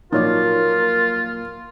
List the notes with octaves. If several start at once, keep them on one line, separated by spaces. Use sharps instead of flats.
A#2 F3 F#3 D#4 F4 A#4 C#5 D5